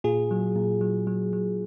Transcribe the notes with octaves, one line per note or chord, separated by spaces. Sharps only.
A#2 F4 G#4
F#3
A#2
F#3
F#3
F#3